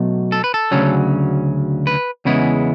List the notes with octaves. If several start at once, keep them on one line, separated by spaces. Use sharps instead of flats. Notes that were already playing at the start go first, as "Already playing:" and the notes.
Already playing: B2 F#3 A3
A4
B4
A4
D2 C#3 F#3 C#4
B4
E2 C#3 G#3 B3 E4